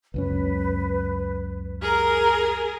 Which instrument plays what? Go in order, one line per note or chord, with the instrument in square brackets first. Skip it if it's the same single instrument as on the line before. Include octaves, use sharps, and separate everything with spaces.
[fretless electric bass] C#2 F#2 C#4 [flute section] B4
[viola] G#4 A#4 [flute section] A#5 F6